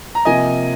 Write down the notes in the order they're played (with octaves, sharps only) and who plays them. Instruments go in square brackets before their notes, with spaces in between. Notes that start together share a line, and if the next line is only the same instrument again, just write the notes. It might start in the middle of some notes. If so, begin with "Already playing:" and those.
[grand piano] A#5
[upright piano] C3 F3 A#3 [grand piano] D#5 G#5